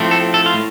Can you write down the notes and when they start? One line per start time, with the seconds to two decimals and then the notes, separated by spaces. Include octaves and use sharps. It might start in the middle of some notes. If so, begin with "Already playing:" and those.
Already playing: A2 F3 A3 C4
0.11 A4
0.34 A4
0.46 F4
0.55 A2